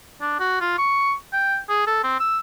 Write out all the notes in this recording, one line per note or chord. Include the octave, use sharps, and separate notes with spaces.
D4
F#4
F4
C#6
G5
G#4
A4
C4
E6